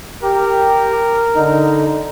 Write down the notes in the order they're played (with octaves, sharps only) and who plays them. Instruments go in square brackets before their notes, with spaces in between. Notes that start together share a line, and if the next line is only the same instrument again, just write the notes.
[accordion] G4 [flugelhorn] A#4
[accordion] D3 D#4